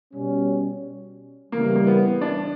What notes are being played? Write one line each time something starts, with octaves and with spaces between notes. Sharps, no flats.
B2 G3 C#4
C#3 E3 G3 A#3
A#3
B3
D4